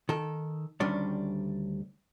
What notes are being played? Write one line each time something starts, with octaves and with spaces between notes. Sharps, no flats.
D#3 A4
D2 D#3 G3 C#4 D4